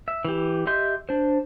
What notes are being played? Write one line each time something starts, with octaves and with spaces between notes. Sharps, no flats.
E5
E3 G4
G4 D#5 E5 C6 G6
D4 C5